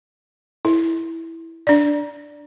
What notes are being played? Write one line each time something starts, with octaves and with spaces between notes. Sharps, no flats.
E4
D4 D5